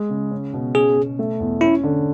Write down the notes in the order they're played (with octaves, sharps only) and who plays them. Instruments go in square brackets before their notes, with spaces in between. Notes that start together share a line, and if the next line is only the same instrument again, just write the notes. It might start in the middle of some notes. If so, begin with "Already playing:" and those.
Already playing: [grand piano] G#3
C#3
C#4
B2
[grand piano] C#4 [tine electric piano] G#4
[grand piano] B2
A3
E2
[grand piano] C#4 [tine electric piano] E4
[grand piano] D3